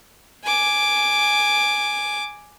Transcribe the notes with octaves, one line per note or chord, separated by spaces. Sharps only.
G#5 D6